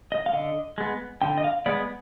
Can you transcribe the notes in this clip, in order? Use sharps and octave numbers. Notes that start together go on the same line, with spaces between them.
D#5
F5
D3 D#5
G#3 B3
D3 G5
D#5
F5
G#3 B3 D5